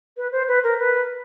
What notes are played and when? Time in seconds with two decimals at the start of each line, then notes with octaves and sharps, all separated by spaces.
0.17 B4
0.32 C5
0.48 B4
0.64 A#4
0.79 B4